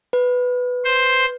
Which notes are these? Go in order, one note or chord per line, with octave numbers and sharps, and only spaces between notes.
B4
C5